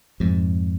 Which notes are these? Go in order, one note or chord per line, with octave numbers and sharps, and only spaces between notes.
F2 G#2